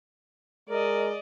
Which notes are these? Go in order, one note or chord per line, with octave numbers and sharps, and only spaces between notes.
G#3 A#4 D5 D#5